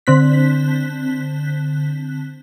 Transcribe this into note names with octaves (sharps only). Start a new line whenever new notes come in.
D3 C4 F#6 B6